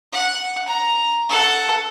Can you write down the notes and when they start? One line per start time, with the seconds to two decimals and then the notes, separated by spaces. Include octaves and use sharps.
0.12 F#5
0.68 A#5
1.29 A4 F#5